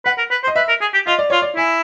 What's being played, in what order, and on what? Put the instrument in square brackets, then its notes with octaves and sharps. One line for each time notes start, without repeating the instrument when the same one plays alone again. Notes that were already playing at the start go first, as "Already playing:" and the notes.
[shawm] B4 [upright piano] F#5
[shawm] A#4
B4
C5
[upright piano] D#5
[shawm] B4 [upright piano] E5
[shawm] A#4
G#4
G4
[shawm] F4 [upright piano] D#5
[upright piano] D5
[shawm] F4 [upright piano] C#5
[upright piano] D5
[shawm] E4 [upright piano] G#5